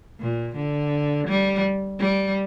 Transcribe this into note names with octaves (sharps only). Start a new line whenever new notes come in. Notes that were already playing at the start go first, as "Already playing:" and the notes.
A#2
D3
G3
G3